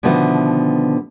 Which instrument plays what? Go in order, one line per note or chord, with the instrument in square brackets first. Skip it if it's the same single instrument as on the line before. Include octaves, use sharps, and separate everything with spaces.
[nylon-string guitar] B2 D3 D#3 F3 A3 B3